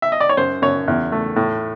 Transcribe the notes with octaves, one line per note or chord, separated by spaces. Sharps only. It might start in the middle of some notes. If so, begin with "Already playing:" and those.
E5
D#5
D5
C#5
F#2 C5
F#2 C#5
E2
A3
A2